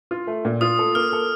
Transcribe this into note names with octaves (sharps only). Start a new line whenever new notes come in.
F4
A3
A#2
F4 D#6
A4
A#3 F6
A4